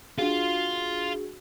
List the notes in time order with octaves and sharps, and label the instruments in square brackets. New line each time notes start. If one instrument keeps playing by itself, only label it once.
[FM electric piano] D4 F#4 G#4 [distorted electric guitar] F4